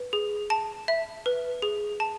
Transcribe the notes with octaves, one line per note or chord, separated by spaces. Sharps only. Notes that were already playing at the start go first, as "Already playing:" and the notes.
Already playing: B4
G#4
A5
E5
B4
G#4
A5